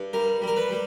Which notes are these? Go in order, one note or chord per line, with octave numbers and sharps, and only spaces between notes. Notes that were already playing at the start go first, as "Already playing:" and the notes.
Already playing: G2
G3 A#4
G3
A#4
B4
G3